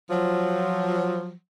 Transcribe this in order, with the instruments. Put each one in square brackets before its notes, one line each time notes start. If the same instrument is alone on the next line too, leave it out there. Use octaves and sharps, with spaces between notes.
[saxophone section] F3 F#3